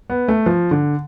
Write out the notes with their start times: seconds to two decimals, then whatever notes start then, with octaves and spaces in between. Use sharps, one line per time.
0.10 B3
0.28 A3
0.46 F3
0.71 D3